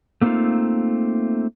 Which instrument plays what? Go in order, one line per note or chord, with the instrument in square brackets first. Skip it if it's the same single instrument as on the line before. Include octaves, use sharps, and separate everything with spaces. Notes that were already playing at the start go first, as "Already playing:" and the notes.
[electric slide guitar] A3 A#3 C4 C#4 D#4 F4